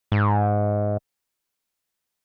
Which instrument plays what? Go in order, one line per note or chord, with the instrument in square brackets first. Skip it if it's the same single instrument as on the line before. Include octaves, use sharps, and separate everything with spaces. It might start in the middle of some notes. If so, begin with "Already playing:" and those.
[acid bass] G#2